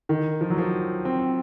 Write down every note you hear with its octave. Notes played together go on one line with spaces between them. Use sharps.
D#3
F3
F#3
F3
C4